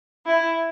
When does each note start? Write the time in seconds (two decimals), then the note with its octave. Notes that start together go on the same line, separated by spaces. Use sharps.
0.26 E4